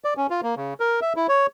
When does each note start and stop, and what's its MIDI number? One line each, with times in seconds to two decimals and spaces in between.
0.05 0.14 74
0.17 0.27 61
0.30 0.41 65
0.43 0.55 58
0.57 0.74 49
0.80 1.00 70
1.02 1.13 76
1.16 1.27 64
1.29 1.47 73